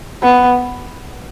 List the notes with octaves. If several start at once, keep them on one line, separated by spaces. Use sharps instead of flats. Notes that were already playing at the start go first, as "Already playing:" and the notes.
B3